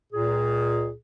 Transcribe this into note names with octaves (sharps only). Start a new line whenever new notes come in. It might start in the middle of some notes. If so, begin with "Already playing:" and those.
C#2 A#2 G#4